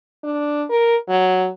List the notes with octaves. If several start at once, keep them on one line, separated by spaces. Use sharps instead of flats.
D4
A#4
F#3